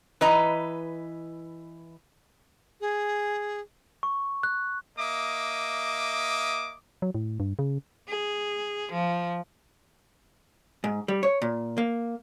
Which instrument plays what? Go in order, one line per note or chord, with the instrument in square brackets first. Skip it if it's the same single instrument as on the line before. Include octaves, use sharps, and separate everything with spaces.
[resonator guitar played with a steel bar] E3 B4 D#5 A#5
[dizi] G#4
[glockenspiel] C#6
F#6
[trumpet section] A#3 D#5 E5 D6 D#6
[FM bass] F#3
A2
G2
C#3
[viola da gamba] G#4
F3
[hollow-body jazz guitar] G#2
G3
C#5
A#2
A#3